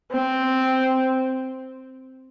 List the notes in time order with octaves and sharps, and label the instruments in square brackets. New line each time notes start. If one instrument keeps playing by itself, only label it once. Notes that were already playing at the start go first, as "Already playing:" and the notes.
[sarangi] C4